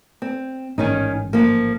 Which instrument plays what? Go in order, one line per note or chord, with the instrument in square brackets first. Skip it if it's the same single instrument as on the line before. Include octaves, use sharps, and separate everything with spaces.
[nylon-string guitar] C4
[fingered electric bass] A1 G#2 [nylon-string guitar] D#3 C#4 D#4
[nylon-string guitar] F3 A#3